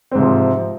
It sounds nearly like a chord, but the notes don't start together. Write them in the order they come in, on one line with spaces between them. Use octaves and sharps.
C4 G#2 C3 F3